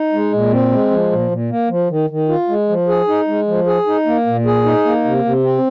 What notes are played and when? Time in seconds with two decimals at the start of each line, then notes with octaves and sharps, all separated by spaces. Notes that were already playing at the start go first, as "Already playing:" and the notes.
Already playing: D#4
0.13 G#3
0.33 A#2
0.52 C4
0.72 G#3
0.91 F3
1.12 A#2
1.31 A#2
1.50 A#3
1.69 F3
1.90 D#3
2.10 D#3
2.29 F4
2.49 G#3
2.69 F3
2.88 G#4
3.08 D#4
3.28 G#3
3.48 F3
3.66 G#4
3.87 D#4
4.06 A#3
4.26 A#2
4.46 G#4
4.65 D#4
4.85 A#3
5.04 C3
5.25 C3
5.43 C4